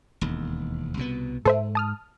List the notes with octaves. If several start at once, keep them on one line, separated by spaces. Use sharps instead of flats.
E1 D#2
C2 B2 B3
G#2 A4 C5 E5
A5 D#6 F6